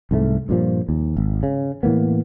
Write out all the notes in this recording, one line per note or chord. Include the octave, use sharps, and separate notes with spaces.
C2 G#2 G#3 A3
G2 A#2 F3
D#2
G#1
C#3
A2 E3 A#3 B3